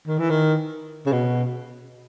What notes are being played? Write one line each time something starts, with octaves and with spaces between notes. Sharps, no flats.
D#3
E3
D#3
C#3
B2